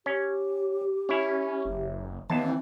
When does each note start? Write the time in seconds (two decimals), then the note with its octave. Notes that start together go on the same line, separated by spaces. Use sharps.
0.06 C#4 G4
1.09 C#4 E4 C#5
1.65 F#1
2.30 D#2 E3 B3 A5
2.43 C4